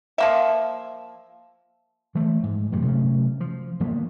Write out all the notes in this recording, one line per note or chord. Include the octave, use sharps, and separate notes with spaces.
F3 A#3 E5
E3 F3 A3
G#2
F#2 A2 C3 E3
C3 F#3 A3 C#4
F3
G1 F3 A#3 B3